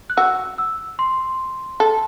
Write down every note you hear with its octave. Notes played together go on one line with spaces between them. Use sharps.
F#6
F#4 E6
E6
C6
A4